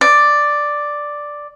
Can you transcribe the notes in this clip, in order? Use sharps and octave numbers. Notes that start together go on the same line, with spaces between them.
D5